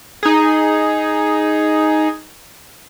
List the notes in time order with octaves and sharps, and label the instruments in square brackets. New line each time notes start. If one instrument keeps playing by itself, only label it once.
[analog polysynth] D#4 G#4